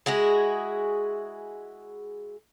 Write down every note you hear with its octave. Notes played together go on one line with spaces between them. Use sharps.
G#3 E4 F#4 G#4